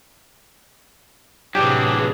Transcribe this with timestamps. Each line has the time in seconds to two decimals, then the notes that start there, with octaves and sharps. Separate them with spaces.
1.55 A2 C3 E3 F#3 D4 G4 G#4